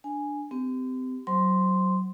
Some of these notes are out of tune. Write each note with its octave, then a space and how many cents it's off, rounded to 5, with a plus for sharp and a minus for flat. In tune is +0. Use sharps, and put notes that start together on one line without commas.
D4 +0 G#5 +0
C4 -35 G4 +0
F#3 +15 C5 +0 C6 +0